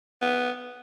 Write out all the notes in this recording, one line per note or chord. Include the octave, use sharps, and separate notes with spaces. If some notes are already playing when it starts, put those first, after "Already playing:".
B3